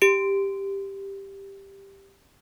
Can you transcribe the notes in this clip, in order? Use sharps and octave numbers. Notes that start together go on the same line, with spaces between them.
G4 D7